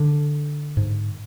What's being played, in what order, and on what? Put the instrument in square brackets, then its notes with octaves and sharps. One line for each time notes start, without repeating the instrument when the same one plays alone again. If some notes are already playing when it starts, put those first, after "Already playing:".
Already playing: [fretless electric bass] D3
G#2